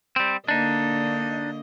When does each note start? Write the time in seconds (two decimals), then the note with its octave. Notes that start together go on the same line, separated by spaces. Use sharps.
0.16 G3 C4
0.48 D3 A#3 D4 D#4 D#5